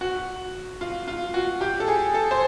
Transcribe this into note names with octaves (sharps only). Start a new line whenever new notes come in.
F#4
F4
F4
F#4
G4
A4
G#4
A4
C5